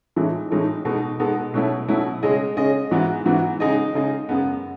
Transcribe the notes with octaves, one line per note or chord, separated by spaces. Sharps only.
A2 E3 G#3 D#4 A4
A2 E3 G#3 D#4 A4
B2 G#3 B3 D#4 A4
B2 G#3 B3 D#4 A4
B2 F#3 A3 C#4 E4
B2 F#3 A3 C#4 E4
C#3 G#3 C#4 G#4 D#5
C#3 G#3 C#4 G#4 D#5
G#2 E3 B3 F#4
G#2 E3 B3 F#4
C#3 G#3 D#4 G#4 D#5
C#3 G#3 D#4 G#4 D#5
F#2 C#3 G#3 B3